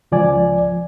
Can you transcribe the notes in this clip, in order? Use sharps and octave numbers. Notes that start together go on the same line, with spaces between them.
C#2 F3 D5 G#5